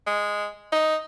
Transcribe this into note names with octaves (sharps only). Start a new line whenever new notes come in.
G#3
D#4